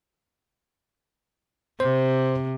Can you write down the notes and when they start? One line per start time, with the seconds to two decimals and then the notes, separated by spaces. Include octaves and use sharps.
1.80 C3 C5